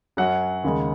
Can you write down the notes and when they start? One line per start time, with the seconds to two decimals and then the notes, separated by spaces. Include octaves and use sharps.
0.17 F#2 F#3 C#4 F#5
0.64 D#2 C#3 G#3